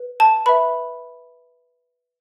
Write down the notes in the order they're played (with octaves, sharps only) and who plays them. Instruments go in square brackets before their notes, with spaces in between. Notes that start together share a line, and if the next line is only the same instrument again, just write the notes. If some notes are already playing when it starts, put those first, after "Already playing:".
Already playing: [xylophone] B4
A5
B4 E5 B5